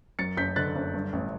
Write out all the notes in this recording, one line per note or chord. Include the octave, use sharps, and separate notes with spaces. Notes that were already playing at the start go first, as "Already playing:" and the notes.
F#2 A6 C#7
F#1 G6 B6
D3 F#6 A6
F#1
G2
A1